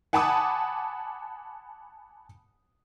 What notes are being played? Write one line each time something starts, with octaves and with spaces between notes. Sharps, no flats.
F#5 G#5 A5 B5 D6 D#6